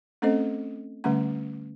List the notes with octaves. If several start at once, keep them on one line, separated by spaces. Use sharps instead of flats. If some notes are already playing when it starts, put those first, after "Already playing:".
A3 C4 C#4 A4 C5 D#5
D3 G3 A3 C#4 F#5